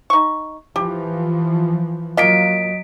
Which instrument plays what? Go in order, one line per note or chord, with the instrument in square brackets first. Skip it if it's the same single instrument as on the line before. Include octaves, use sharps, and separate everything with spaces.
[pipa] D#4 C#6
[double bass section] E3 F3 [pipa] G4
[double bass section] F#3 [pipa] A#3 F4 [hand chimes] D#5 B6 D7